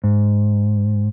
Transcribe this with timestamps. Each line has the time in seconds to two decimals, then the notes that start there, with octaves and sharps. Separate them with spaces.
0.04 G#2